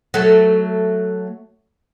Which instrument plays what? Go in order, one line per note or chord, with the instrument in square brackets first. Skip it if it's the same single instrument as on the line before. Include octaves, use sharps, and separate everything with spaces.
[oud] F#3 A3